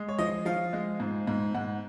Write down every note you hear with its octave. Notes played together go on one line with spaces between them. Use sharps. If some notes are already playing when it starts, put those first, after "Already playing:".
Already playing: G#3
C#5
F3 D#5
F3 F5
G#3
G#2
G#2
G#2 F#5